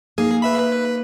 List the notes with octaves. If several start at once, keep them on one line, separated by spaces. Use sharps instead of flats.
A#3 D#4 G#4
B4 E5 B5
B4